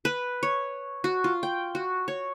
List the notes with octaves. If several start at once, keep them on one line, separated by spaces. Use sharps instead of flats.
B4
C#5
F#4
F4
G5
F#4
C#5